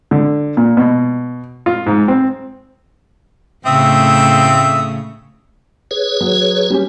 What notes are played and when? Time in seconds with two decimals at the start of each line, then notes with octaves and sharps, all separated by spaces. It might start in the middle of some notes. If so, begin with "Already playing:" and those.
0.11 D3
0.57 A#2
0.77 B2
1.66 F4
1.86 G#2
2.08 C4
3.66 A2 C#3 A3 C4 E5 D#6
5.91 G#4 B4 C#5
6.21 F#3
6.70 G3 C#4 G4